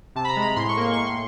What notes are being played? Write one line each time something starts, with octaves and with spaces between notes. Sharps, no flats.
C3 A5
B5
A#5
G#3
B5
A2 C6
C#6
A#3 C6
A2 C#6
C6